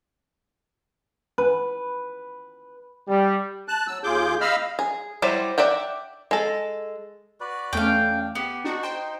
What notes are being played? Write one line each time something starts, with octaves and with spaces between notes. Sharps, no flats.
B4
G3
A5 F#6
F#3 E6
D#2 F4 G#4 D6 G6
D#5 F5 B5 E6 F6
G#4
F#3 G3 E4 C5 D5
D5 E5 F#5 G5
G#3 A4
F#4 B4 D5
E2 A3 C#4 F5 G5
D4
B3 G4
D4 D#4 F#4
C5 G5